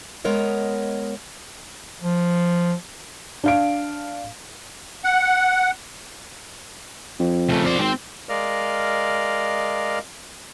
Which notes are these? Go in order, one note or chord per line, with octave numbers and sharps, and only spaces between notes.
G#3 B3 A#4 C#5 D#5
F3
D4 F5 D7
F#5
F2
C#3 A3
C5 D5
G#1 C4
G#3 A#4 D5 D#5 F5 F6